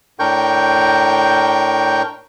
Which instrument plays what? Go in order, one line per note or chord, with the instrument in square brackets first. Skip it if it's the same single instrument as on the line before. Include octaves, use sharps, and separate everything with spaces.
[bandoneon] A2 D4 A#4 G5 C#6 G6